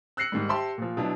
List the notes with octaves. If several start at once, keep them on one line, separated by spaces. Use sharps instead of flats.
E6 F#6 A#6 C7 C#7 F#7
G#2 D#3 G3
G4 C5 E5 G5 A5 C6
A#2 F3
B2 F#3 D4 E4